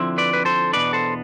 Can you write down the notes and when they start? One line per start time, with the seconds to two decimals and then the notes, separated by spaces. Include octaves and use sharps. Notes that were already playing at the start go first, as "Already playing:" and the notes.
Already playing: D3 F3 C4 E4
0.18 B4 D5
0.33 B4
0.45 A4 C5
0.73 E2 B2 B3 D4 B4 D5
0.93 A4 C5